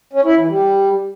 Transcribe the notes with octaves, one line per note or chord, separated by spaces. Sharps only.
C#4
E4
E3
G3